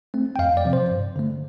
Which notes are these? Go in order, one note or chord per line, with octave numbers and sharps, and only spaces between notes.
A3 C4
G5
F2 F5
D5
C3 F3 C4
C5
G2
D3 A3